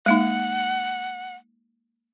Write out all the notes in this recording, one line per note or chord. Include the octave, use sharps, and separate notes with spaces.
G#3 A#3 D#4 F#5